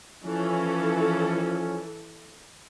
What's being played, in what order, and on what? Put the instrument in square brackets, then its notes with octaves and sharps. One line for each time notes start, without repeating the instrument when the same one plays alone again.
[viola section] E3 A4 [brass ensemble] F3 C#4